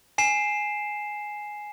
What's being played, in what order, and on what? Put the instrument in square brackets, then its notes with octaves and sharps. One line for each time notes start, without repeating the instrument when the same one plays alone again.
[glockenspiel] G#5 C7 E7